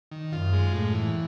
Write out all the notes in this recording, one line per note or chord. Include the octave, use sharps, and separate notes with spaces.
D#3
F#2 F4
G#3
A2
E3